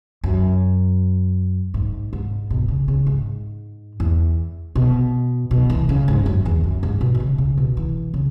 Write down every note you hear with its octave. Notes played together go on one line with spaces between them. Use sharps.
F#2
G#2
G#2
B2
C#3
C#3
G#2
E2
B2
B2
E3
C#3
G#2
F#2
E2
F#2
G#2
B2
E3
C#3
C#3
B2
E3
C#3